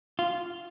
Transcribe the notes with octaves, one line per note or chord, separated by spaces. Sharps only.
F4